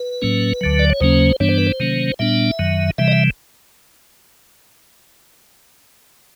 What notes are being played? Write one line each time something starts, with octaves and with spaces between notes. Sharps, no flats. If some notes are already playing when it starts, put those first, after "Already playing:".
Already playing: B4
A2 F#3 A#3 C#4
D2 D3 F#3
D5
C#5
D#2 C#3 F#3 A#3 C#4 C5
G2 E3 G3 B3 D4 C#5
C5
B4
C5
C3 D#3 F#3 A#3 C#4
A#2 G3 B3 D4 E5
F#2 D#3 F#3
C3 E3 G3 E5
D#5
E5